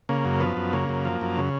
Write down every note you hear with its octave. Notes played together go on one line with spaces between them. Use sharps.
C#3 A#3
F#2
F3 B3
F#2
C#3 A#3
F#2
F3
F#2
C#3